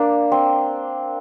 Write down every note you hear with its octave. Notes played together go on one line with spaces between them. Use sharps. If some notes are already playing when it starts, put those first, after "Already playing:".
Already playing: A#3 D4
C4